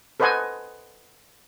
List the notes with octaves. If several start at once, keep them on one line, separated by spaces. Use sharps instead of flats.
A4 B4 C5 D#5 F#5 G#5